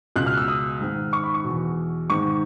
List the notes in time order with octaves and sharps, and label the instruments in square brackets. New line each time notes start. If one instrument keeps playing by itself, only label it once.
[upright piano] C#2 B2 F#6
F6
E6
D#6
G#2 D#3
C#6
B5
C#6
E2 B2
G#2 D#3 C#6